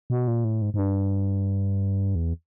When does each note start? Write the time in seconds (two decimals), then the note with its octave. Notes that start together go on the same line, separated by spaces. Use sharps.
0.10 B2
0.28 A#2
0.44 A2
0.62 G#2
0.74 G#2
0.79 G2
2.15 E2